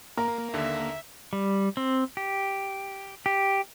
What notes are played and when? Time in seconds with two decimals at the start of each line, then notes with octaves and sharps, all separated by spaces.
0.17 A#3 A#4 A#5
0.53 D#2 D3 E5
1.33 G3
1.77 C4
2.17 G4
3.26 G4